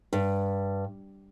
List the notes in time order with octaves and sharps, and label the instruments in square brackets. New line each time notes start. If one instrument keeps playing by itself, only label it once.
[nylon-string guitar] G2